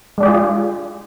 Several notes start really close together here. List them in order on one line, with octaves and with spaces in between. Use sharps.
G#3 D4 G4 G#4 F4